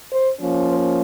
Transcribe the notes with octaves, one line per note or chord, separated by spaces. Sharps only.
C5
F3 A#3 C#4
C5